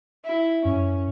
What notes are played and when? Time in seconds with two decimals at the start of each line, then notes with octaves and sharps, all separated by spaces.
0.25 E4
0.65 F#2 C#4